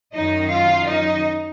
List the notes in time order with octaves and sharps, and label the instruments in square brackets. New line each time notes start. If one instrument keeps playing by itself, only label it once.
[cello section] F#2 D#3 F#3 D#4 D#5
F4 F5
D#4 D#5